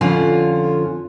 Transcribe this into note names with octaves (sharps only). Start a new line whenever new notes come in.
F2 D3 C#4 F4